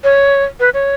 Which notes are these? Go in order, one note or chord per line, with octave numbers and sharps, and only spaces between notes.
C#5
B4
C#5